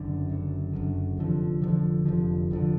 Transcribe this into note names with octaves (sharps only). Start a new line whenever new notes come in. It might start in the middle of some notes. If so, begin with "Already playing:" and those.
Already playing: F#1 F#2 D3
F#1 F#2 D3
F#1 F#2 D3
F1 F2 D3 F3
F1 F2 D3 F3
F1 F2 D3 F3
F1 F2 D3 F3